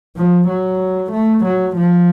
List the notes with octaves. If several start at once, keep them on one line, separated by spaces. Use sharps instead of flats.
F3
F#3
A3
F#3
F3